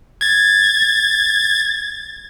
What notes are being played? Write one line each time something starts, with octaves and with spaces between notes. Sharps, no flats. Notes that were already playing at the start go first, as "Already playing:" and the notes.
G#6 A6